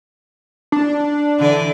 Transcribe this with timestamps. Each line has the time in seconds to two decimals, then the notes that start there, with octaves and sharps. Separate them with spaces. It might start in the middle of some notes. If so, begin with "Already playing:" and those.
0.72 D4
1.39 D3 E3 D5